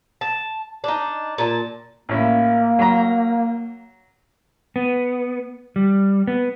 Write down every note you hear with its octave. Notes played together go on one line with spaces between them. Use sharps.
A5
D4 D#4
A#2 A5
A1 A#3 C#4 E4
F#3 A#5
B3
G3
B3